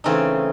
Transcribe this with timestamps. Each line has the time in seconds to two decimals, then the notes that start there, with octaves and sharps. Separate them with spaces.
0.04 C#3 E3 A3 C4 D#4